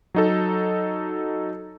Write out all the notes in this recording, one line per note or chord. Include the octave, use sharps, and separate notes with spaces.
F#3 D#4 A4